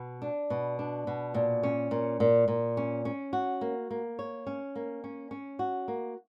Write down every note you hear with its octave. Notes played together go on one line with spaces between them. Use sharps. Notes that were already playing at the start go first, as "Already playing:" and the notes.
Already playing: B2
D4
B2
D4
B2
A#2
C#4
A#2
A#2
A#2
C#4
C#4
F#4
A#3
A#3
C#5
C#4
A#3
C#4
C#4
F#4
A#3